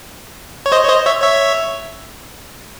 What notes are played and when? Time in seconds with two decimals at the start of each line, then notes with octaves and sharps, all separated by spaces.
0.66 C#5
0.72 C5 D#5
0.85 C#5
0.89 C5 D#5
1.06 C#5 E5
1.22 C#5 E5